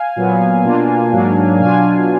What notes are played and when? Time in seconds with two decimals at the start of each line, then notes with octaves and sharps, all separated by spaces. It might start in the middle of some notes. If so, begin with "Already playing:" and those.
Already playing: F5 G#5
0.16 A#2 F#3 B3
0.64 B2 A#3 D4 F4
1.12 G#2 F#3 A#3 D4
1.60 B2 F#3 D4 F4 F5 G#5